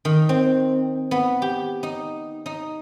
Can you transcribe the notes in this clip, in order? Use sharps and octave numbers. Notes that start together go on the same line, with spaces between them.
D#3
C4
B3
G4
D#4
D#4